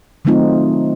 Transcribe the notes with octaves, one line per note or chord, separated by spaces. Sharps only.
D#3 F#3 A3 C4 D#4 F4